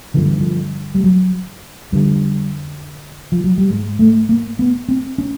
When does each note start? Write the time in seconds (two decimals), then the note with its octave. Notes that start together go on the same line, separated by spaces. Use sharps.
0.14 G2 D3 F3
0.27 E3
0.40 F3
0.95 G3
1.04 F#3
1.92 F2 D3 G3
3.32 F3
3.44 F#3
3.58 G3
3.70 G#2 G#3
3.99 A3
4.29 A#3
4.59 B3
4.89 C4
5.18 C#4